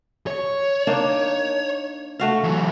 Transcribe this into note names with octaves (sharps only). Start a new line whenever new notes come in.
C#5
A#3 D4 D#4
A3 F#4 F5
E3 F#3